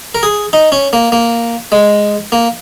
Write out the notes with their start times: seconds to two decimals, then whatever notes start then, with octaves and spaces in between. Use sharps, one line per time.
0.15 A#4
0.23 G#4
0.53 D#4
0.72 C#4
0.93 A#3
1.12 A#3
1.72 G#3
2.32 A#3